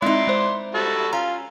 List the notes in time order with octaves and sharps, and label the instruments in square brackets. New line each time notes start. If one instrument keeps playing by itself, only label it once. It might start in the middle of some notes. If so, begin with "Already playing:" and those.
[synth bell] G#3 C4 [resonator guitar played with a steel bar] D#4 E4 [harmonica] D5 C6
[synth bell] G#3 C5
[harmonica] G3 F#4 A4
[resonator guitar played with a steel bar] C#4 [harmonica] F4 [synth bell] A#5